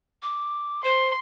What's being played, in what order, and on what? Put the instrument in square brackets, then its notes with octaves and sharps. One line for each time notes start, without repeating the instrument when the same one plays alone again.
[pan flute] D6
[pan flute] C5 [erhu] C6